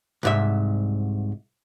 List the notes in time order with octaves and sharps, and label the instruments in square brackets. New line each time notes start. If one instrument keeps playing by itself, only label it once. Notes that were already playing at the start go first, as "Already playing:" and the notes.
[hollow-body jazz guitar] C2 G#2 E5